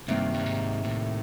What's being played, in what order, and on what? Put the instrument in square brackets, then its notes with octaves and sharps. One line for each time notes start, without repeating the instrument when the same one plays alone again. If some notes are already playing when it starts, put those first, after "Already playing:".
[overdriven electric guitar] G2 [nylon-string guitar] C3 D#3 G3 A#3
[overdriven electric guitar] G2
G#2
A2